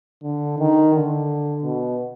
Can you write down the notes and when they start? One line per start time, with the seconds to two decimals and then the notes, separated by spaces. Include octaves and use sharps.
0.23 D3
0.59 D#3
0.94 D3
1.63 B2